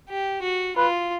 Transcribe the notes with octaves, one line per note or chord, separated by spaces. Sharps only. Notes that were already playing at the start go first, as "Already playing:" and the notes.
G4
F#4
F4 B4